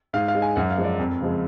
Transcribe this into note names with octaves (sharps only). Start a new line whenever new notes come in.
G#2 F5
F5
G#3
G#5
F#2 F#5
F5
F3 G#3
D5
F2
C#3 F3 G#3